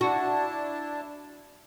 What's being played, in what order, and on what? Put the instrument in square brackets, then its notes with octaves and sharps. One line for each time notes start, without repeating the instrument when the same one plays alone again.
[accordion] D4 E4 A5 [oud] F#4